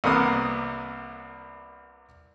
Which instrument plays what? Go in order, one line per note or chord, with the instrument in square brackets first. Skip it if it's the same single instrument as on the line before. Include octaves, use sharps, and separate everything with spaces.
[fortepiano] C2 C3 A#3 B3 D#6